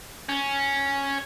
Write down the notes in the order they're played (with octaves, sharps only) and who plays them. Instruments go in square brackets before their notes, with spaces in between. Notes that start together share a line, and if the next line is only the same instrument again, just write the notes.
[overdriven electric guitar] C#4